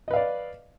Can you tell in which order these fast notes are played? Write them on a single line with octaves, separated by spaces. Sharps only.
D#5 B4 F5 D5